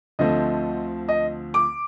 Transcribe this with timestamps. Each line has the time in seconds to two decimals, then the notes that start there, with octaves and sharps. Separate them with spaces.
0.19 D2 D3 F3 A3 C4 D#5
1.09 D#5
1.54 D6